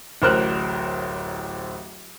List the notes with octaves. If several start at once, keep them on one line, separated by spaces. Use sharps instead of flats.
D1 A1 A#4 C5 F6 F#6